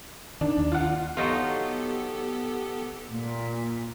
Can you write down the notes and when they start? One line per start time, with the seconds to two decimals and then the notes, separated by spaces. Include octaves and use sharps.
0.41 D#3 D4
0.57 D#2
0.72 F4 F#5
1.17 F#3 B3 D#4 F4 G4 A4
3.12 A#2